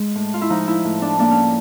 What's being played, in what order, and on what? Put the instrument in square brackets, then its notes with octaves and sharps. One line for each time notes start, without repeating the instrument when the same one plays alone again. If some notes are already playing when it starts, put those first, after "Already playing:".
Already playing: [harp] G#3
A2
F4
E4
F3 D#4
E4
A2
D4
A#3 D4
C#4